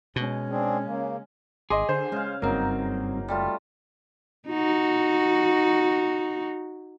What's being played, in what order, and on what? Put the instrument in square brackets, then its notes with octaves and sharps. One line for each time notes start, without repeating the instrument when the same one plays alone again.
[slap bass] B2 [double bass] G#3 C#4
[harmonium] C4 D4 G#4
C#3 A#3
[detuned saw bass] G#1 [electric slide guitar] G#4 [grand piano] D#5 C6 D6
[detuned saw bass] D3 [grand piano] C5
[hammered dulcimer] C#3 F5 [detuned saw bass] G#3
[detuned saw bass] F#1 [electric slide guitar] G2 C4 [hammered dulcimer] F#3 D#4 [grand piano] A#3
[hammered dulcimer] G3 A3 F4
[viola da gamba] D#4 F#4